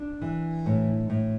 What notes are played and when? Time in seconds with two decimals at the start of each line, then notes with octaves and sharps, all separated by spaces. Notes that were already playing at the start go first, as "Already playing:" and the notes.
Already playing: D4
0.21 E3
0.66 A2
1.10 A2